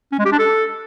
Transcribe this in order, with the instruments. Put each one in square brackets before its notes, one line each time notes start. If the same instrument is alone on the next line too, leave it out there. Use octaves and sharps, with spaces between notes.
[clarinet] C#4
G#3
G4
D4
A4